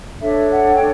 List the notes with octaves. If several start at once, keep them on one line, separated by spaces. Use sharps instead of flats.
D4 A4 C#5 E5
F#5
G5